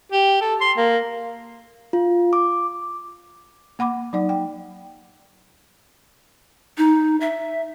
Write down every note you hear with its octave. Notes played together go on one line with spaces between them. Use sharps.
G4
A4
C6
A#3
F4
D6
A#3 F#5 B5 D6
F#3 D#4 D5 F#5
G5
D#4
E5